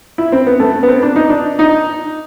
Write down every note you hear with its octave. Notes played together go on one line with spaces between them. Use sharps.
E4
C4
B3
A3
B3
C4
D4
D#4
D4
D#4